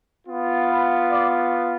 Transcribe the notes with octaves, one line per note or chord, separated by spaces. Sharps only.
B3 F4
B4
D5